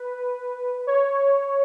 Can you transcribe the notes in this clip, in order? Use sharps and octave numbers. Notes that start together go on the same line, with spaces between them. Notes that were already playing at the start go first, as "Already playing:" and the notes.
Already playing: B4
C#5